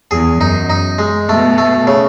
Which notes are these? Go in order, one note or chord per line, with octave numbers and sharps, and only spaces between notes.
E2 G#4
F#2 D#4
D#4
G#3
B2 A3
A3
C#3